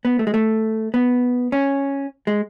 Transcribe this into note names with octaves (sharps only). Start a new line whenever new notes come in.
B3
A3
G#3
A3
B3
C#4
G#3